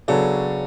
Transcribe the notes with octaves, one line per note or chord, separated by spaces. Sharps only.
C#3 F#3 B3 D4 A4 C#5